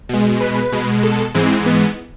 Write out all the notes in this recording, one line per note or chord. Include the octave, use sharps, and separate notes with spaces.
B2 G#3
B4
B2 G#3
A4
G#2 E3 G#3 C4
B3